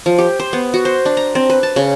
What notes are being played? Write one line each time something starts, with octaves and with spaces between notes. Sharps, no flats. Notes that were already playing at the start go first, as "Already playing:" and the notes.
F3
G4
C5
B3
F#4
C5
D4
A#5
C4
B4
A5
C#3